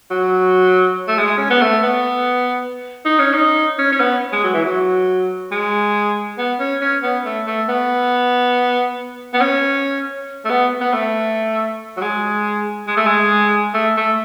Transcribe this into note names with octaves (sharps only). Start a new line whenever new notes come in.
F#3
A3
G#3
C#4
B3
A3
B3
D#4
C#4
D#4
C#4
C#4
B3
G#3
F#3
E3
F#3
G#3
B3
C#4
C#4
B3
A3
A3
B3
B3
C#4
A3
B3
B3
A3
F#3
G#3
G#3
A3
G#3
A3
A3